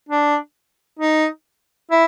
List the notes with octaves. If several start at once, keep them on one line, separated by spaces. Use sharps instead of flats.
D4
D#4
E4